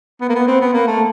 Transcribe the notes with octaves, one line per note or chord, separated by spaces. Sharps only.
B3
A#3
B3
C4
B3
A#3
A3